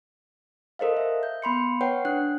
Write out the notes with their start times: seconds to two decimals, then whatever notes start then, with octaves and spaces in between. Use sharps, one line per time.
0.79 A4 A#4 C5 D#5 F5
0.97 E5
1.23 G6
1.42 B3 B5 C6 C#7
1.81 B4 C#5 F#5 G5
2.05 D4 F#6